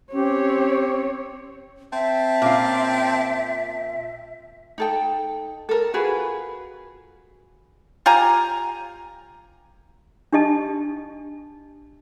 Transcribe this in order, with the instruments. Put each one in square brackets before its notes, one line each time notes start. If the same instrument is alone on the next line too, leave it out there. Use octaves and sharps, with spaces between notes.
[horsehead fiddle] C4 C#5 [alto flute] C#4 [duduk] G4
[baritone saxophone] C4 [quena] E5 [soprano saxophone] A5
[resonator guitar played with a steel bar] A#2 C#4 F5
[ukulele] D#4 A4 G5
A4 A#4
F4 F#4 G#4 B4
[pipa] F4 G4 G#5 A#5
[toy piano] D4 G4 D#5 A5